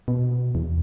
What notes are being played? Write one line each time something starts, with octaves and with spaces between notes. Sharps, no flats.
B2
E2